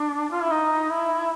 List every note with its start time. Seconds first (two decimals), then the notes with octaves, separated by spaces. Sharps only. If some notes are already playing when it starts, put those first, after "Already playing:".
Already playing: D4
0.30 F4
0.40 E4
0.50 D#4
0.90 E4